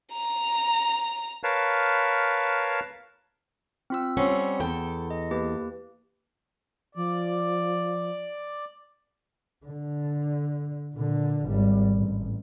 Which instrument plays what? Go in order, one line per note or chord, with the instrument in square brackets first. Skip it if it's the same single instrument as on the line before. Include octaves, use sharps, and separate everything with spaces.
[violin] A#5
[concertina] A#4 B4 C#5 F5 A5
[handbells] C4 F4 E6
[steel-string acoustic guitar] G3 C4 C#4 [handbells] F#5
[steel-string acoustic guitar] E2 A4 G5
[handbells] D#5
A#3 G4 B4
[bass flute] F3 [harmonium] D5
[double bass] D3
A#2 D3
G#1 G3
A1